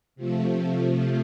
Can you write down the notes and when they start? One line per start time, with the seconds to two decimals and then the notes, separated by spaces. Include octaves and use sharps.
0.16 C3 F3 A3